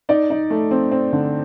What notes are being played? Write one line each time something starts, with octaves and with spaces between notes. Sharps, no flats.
D#4 D5
D#4
A3
C4
C4
D3